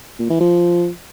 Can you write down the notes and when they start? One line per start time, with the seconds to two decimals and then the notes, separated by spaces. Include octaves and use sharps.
0.19 A#2
0.30 E3
0.40 F3